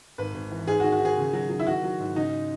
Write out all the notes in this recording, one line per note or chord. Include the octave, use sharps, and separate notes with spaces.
G#1 B4
G#1
E3
G#2 G#4
F#4
D#3
F#4
D#3 G#4
C#3
F#3
F#3
E4
D#3 F#4
F#3
G#2
C#3 D#4